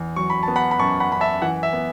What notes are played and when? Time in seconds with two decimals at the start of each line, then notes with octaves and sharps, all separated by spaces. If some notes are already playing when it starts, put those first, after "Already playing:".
Already playing: E2
0.16 F#3 C#6
0.30 B5
0.43 B3 A5
0.56 F#5 B5
0.71 B5
0.79 F#2 A5 C#6
1.00 F#5 B5
1.10 F#2 B5
1.21 E5 A5
1.42 E3 F#5
1.63 E5
1.73 B3